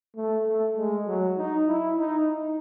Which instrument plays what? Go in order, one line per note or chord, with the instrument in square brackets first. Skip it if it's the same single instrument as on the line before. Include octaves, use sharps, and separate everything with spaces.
[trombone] A3
A3
G#3
F#3
D#4
E4
D#4
D#4